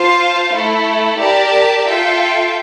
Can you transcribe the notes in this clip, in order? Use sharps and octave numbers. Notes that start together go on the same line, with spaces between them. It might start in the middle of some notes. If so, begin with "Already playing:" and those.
Already playing: F4 C5 F5 A5
A3 E4 A4
G4 A#4 D5 A5
F4 A4 E5 G5